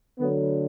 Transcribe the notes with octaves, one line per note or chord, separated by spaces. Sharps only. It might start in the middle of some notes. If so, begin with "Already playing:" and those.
D3 F#3 A3 B3